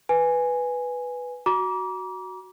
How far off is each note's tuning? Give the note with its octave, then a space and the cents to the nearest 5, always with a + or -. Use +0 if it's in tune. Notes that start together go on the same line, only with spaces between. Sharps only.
B4 +0 G#5 +0
F#4 +0 A#5 +35 D6 -20